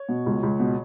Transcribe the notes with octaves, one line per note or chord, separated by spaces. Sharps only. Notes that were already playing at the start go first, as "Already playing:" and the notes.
Already playing: C#5
B2
C#2
C#2
B2